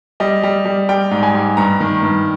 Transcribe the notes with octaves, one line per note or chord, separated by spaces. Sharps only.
G3 D#5
G3
G3
G3 G5
G#2
G#5
G3
G2 A#5
D#3
G2